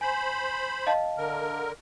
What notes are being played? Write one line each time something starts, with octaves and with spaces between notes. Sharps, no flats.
C5 G#5 B5
D#5 F5 A5
D3 A#4